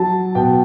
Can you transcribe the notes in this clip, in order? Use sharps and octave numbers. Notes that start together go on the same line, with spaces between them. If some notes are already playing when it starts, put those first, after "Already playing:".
Already playing: F#3 A5
B2 G5